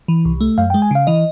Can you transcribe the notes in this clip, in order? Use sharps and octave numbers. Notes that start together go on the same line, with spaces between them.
E3
C2
A3
F#2 F5
G#3 G5
G#5
C#3 F5
E3 D#5